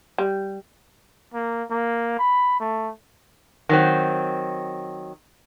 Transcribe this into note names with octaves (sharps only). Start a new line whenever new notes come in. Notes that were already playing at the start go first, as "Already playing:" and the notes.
G3
A#3
A#3
B5
A3
D#3 F#3 C4